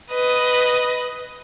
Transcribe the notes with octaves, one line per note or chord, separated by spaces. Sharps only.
B4 D#5